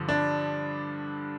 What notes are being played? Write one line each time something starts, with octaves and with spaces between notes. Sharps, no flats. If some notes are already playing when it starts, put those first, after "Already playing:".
Already playing: G2 D3 F3
D4